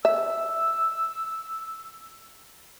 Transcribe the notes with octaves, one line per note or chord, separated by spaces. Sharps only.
E5 E6